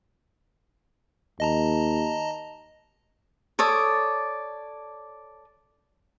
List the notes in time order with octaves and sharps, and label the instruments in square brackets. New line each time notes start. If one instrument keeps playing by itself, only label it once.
[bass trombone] D#2 [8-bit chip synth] D#5 A5 A#5
[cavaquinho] A4 C#5 D5 D#6